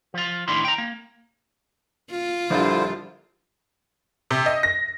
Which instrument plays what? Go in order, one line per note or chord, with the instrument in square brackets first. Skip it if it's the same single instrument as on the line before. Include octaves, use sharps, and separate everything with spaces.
[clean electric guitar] F3 F4
A2 D#3 D4 E4 C6
G5 A#5
A#3
[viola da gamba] F4
[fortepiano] A#1 G3 [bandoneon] D3 E4 C5
[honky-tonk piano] C3
D#5
A#6